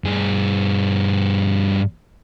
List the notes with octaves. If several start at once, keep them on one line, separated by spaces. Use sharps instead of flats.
G2 G#4